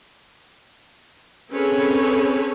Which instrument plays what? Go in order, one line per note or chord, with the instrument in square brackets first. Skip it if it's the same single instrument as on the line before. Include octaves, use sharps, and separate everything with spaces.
[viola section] C4 C#4 G#4 A4 B4 C#5